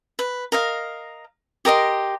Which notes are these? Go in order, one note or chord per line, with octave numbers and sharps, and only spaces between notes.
B4
A#4 D#5 F5
G4 A#4 D#5 C6